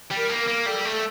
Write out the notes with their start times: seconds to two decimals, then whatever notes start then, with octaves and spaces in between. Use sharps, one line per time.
0.11 G3
0.17 A#4
0.29 A#3
0.41 A#4
0.48 A#3
0.66 G3 A4
0.85 A3
0.92 A4